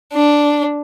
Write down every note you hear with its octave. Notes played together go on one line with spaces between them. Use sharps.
D4